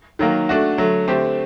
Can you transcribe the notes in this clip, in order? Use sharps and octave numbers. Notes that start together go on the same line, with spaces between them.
D#3 F#3 A#3
A3 D4 F#4
D3 F#3 A3
D3 A3 C4 G4